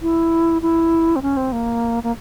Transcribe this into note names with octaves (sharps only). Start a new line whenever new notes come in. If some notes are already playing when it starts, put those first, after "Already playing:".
E4
E4
C4
C#4
C4
A#3
A#3